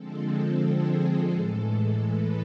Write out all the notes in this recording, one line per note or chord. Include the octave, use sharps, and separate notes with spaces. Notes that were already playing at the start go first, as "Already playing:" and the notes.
Already playing: D3 F3 G#3 C4 A4
A4
G#4
A4
A2 E3 G#3
B4